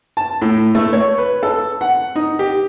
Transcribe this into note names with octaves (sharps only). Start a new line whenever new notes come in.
A5
A2
A3
C#5
B4
A4
F#5
D#4
G4